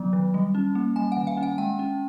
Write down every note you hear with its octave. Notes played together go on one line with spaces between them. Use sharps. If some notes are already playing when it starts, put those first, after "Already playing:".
Already playing: D#3 F#3 B3
D#3
G3
C#4
A#3
G3 G#5
D#3 F#5
F5
C#4
F#5
G#3 G5
C#4